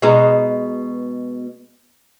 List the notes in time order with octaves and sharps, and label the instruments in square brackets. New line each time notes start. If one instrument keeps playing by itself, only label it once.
[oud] B2 G#3 D#4